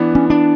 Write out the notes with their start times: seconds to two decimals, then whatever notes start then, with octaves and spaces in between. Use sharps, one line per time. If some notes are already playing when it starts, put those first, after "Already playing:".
Already playing: E3 B3 D4
0.15 C#4
0.30 D4